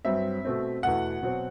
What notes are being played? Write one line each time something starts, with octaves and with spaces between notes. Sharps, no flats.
G2 F#3 C4 E5
B2 A3 C4
E2 B2 A3 F#5
B2 F#3 C4